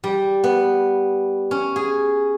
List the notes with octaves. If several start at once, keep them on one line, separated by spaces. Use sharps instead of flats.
G3
B3
C#4
G#4